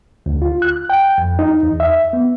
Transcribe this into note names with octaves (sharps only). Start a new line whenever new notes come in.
D2
F4
F#6
G5
F2
D#4
E2
E5
B3